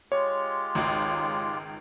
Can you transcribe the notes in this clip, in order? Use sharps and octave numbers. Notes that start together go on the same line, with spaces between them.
G#3 F4 G4 C#5
G#1 C#2